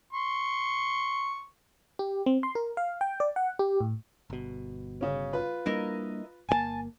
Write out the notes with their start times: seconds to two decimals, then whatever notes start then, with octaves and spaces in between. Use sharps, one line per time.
0.13 C6 C#6
1.99 G4
2.26 C4
2.43 C6
2.55 A#4
2.77 F5
3.01 G5
3.20 D5
3.36 F#5
3.59 G4
3.81 A2
4.30 G1 B2
5.01 C#3 C#4
5.33 F4 B4
5.66 G3 A#3 D4 E4 A#4 D#5
6.49 G1 B2 A#3 G#5 A5